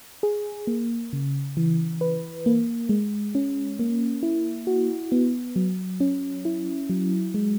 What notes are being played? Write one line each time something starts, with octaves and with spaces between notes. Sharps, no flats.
G#4
A#3
C#3
E3
B4
A#3
G#3
C#4
A#3
E4
F#4
B3
F#3
C#4
E4
F#3
G#3